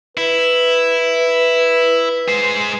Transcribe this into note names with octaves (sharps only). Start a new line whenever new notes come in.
E4 B4
G#3 C5